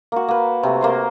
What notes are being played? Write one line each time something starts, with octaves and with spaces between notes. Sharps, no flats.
A#3 F#4
A#3 B4
C3 A3
A#3 C5 C6